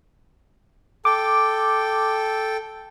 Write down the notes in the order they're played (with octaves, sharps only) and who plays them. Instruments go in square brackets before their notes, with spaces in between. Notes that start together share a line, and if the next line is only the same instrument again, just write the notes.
[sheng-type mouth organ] A4 G5 [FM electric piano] D6